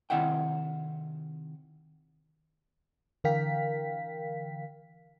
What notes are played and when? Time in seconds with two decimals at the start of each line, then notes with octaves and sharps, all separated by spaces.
0.10 C3 D#3 E4 E5 F#5 G5
3.24 D3 E3 A#4 F5 G5 B6